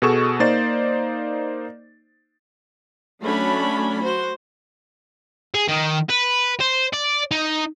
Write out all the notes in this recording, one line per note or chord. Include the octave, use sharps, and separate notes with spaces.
B2 F#4 G#4 A4 C#6 E7
A#3 D#4 C5 D5 A6
F#3 A3 C#4 D4 B5
F#4 C5
G#4
D#3
B4
C5
D5
D#4